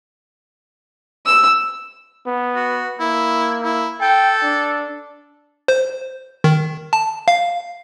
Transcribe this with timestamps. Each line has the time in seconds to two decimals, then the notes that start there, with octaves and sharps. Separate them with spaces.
1.26 E6
2.27 B3
2.55 F#4
3.00 A#3 E4
3.62 E4
4.01 A4 G5
4.42 D4
5.68 C5
6.44 D#3
6.93 A5
7.28 F5